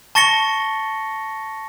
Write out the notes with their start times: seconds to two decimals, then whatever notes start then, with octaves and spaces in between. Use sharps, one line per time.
0.15 A5 C#6 A6 A#6 C#7 G7